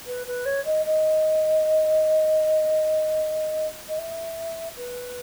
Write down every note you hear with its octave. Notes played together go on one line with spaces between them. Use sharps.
B4
B4
C#5
D#5
D#5
D#5
E5
B4